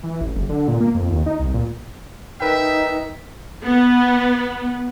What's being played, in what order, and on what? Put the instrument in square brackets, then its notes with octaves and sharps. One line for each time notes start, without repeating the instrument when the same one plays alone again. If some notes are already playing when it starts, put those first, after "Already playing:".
[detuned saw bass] E3
A1
F#1
D3
A#2
A#3
F2
D#2
D#4
C2
A#2
[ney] D#4 [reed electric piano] A#4 B4 G5 [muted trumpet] E5
[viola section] B3